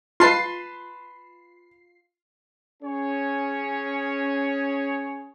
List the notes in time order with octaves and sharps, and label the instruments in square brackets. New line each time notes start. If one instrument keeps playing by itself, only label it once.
[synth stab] F4 C7 [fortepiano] B4 A5 C6
[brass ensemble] C#4 G#4 C#5